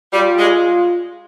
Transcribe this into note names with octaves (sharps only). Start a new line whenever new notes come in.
G3 F4
G#3